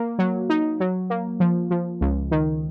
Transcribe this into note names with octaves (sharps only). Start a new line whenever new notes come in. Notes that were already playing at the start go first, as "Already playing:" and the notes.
Already playing: A#3
F#3
D#4
F#3
A#3
F3
F3
C#2
D#3